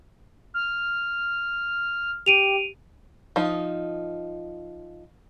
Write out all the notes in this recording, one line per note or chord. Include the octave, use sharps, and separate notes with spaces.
F6
G4 D7 D#7 F7
F3 D#4